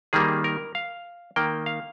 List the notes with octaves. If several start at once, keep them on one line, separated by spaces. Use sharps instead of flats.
D#3 G3 A#3 G#4
A#4
F5
D#3 A#3 G5
F5